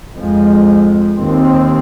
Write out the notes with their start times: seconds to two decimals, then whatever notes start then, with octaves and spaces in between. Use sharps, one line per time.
0.16 F2 F3 G#3
1.18 D#2 D#3 C4